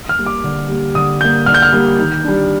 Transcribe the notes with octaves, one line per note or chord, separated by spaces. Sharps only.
F6
G3 A#3
D6
D3
G3 A#3
D3 D#6
G3 A#3 G6
D3 F6
G6
F6
G3 A#3
D#3
G3 D4